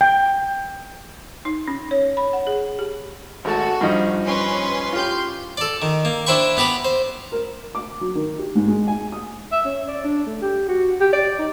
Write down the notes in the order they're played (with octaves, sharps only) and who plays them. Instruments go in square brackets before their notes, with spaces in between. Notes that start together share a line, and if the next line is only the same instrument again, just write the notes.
[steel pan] G5
[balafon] D#4
C#4
C#5
B5
F#5
G#4
G4
[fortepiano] G#1 A3 A5 [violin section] F#4
[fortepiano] G2 F3 D#4
[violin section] C#4 B4 C6
[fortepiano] F4 G4 [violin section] C6 G6
[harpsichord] A4 D5
D#3
A#3
D4 E4 C5 G5 B5 C#6
B3 G4 B4 A#5 B5
C5
[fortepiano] A#4
D6
F#3
D#3
G4
G#2
G#3
G#5
D#6
[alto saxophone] E5
C#4
D5
D4
A3
G4
F#4
G4
D5
D#4